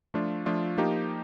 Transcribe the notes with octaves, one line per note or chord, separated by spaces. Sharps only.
F3 A3 D4 F4
F3 A3 D4 F4
F3 A#3 D#4 G4